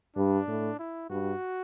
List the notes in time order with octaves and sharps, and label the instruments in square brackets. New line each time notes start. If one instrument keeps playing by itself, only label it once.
[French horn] G2 [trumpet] D4
[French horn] A2
[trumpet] E4
[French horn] G2 [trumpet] F#4